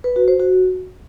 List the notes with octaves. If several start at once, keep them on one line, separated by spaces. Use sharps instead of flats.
B4
F#4
C5
F#4